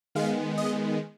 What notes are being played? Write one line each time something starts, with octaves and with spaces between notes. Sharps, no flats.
D#3 G#3 B3 F5
D#5